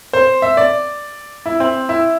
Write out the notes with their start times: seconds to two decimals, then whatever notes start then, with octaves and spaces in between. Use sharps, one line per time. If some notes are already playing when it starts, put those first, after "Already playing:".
0.13 C5
0.42 E5
0.57 D5
1.46 E4
1.60 C4
1.89 E4